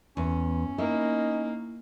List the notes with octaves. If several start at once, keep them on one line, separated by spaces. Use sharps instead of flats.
E2 C#4
A#3 D#4 E4